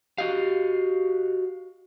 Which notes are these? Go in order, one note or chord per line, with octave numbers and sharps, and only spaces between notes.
F#4 G4 D#5 F5